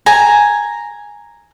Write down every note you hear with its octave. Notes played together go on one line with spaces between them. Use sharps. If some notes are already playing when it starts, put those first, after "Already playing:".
G#5 A#5